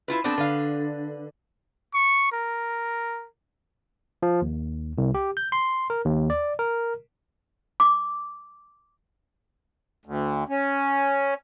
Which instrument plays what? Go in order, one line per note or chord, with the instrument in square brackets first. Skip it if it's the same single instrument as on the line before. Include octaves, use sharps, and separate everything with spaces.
[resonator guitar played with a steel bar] E4 F4 B4
[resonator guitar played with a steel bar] B3 C4 A4 [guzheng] D4
[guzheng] D3 [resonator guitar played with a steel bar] B4 F5
[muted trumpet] C#6
A#4
[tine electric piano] F3
D#2
C2
G4
G6
C6
A#4
D#2
D5
A#4
[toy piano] D6
[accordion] D2
C#4